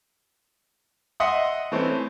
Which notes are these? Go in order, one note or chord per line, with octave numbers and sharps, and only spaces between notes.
D#5 E5 F#5 C6 D#6
E3 A3 C4 C#4